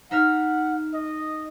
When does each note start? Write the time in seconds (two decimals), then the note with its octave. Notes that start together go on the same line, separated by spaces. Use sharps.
0.11 D#4 E5 F#5 F6
0.94 D#5